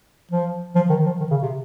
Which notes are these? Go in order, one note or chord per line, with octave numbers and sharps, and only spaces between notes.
F3
F3
D#3
F3
D#3
C#3
C3